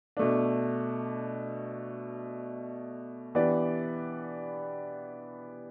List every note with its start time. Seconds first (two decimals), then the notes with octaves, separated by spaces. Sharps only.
0.17 B2 A3 D4
3.35 E3 B3 D4 G4 D5